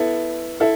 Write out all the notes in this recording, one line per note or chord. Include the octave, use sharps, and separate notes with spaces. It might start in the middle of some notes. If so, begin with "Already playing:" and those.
Already playing: B3 E4 A4
E4 A4